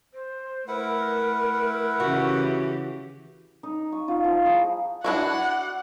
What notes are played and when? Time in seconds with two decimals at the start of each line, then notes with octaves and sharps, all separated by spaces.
0.14 C5
0.68 A3 E4 A#4 B4 F#5
2.00 C#3 E3 F#4 G4
3.63 D#4
3.92 C#6
4.08 D#4 F4 F#5
4.24 F3
4.45 D#4 E4 G#4
5.04 D4 E4 F#4 F#5